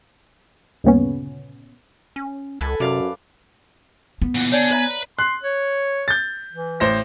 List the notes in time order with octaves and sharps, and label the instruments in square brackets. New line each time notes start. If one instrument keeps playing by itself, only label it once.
[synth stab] D2 G2 A#2 C#3 B3 C#4
[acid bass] C#4
[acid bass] C#2 [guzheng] A4 B4 G#5
[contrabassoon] F#2 [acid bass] C3 [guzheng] D5 F5
[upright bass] B3
[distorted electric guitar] A#2 E3 [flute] F#5
[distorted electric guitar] D3 D4 [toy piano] C#5 D5 [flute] G#5
[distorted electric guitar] B4 B5 [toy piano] C5 E5 A#5
[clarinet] C6 [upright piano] F#6
[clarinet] C#5
[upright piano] G6 A6
[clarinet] E3
[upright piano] A1 C5 A#6